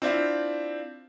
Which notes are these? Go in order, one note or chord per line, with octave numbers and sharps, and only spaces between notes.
C4 D4 E4 F4